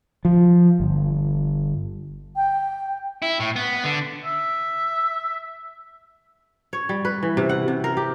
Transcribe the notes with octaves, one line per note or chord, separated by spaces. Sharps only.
F3
G1
G5
E4
A2
B3
D3
E5
C#5
G3
B4
E3
C3
F#5
C3
A#4
G4